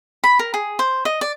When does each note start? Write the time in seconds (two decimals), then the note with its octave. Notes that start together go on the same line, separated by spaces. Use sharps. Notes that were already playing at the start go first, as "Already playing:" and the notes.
0.24 B5
0.39 A#4
0.54 G#4
0.79 C5
1.05 D#5
1.21 D5